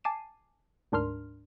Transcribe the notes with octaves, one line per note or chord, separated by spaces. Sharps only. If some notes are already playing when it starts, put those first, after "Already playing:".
G#5 A5 D6 C7 D#7 E7
D2 G#2 D4 A#4 C6 F6